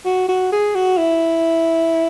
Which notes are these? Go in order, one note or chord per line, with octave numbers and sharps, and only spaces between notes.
F#4
F#4
G#4
F#4
E4